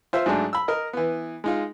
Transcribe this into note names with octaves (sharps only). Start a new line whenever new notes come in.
F4 C5 E5
G#2 F#3 G#3 A3 D4
B5 E6
A#4 D#5
E3 B3
G#3 D#4 F4